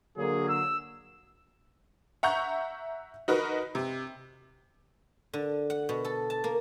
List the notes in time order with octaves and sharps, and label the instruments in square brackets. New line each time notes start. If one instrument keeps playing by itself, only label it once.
[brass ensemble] D3 F#3 A#3 [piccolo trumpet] G#4
[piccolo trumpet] E6
[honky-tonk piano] E5 F#5 A#5 C#6 G6
D#4 F#4 A#4 B4
C3
[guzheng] D3
F#5
B2
A4
A5
A#3